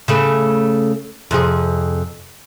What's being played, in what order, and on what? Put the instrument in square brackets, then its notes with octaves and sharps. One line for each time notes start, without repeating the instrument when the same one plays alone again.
[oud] C#3 A3 B4
F2 C3 G#4